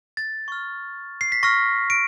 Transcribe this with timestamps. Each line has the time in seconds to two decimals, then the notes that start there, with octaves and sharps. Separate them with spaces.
0.17 A6
0.48 C#6 F6
1.21 C7
1.32 B6
1.43 C#6 F6 A#6
1.90 D7